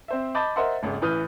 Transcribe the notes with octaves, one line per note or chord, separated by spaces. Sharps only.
C4 C5 E5
D#5 A5 B5 D6 G6 A6
A#4 C5 D#5 E5 F#5 C6
D#1 G#1 C#3
A1 E3 B4 D#6 F6 G6